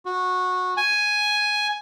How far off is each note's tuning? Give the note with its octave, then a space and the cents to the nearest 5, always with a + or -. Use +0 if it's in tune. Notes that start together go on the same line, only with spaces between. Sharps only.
F#4 -15
G#5 +5